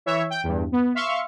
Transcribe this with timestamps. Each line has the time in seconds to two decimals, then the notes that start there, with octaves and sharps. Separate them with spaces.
0.06 E3 C#5 E5
0.30 G5
0.43 E2 G2
0.72 B3
0.95 E5 F5 C6 C#6